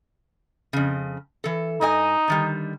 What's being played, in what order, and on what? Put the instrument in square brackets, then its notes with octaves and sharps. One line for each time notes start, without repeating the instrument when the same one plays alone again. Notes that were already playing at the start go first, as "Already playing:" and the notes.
[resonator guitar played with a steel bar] F2 C#3
E3 A4
[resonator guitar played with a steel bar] G2 D#5 G#5 [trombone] D#4
[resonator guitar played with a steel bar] D3 D#3 G3